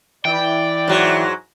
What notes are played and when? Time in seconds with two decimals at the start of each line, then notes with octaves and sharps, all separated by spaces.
0.25 E3 E4 D5 G5
0.88 G#2 F#3